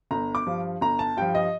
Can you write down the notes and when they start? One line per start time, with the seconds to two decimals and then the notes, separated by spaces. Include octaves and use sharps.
0.11 G1 A#5
0.35 D6
0.46 G2 F3
0.81 G1 A#5
0.99 A5
1.17 G2 F3 G5
1.35 D#5